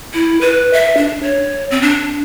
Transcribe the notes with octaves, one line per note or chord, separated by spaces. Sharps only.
E4
B4
E5
D4
C#5
C4
D4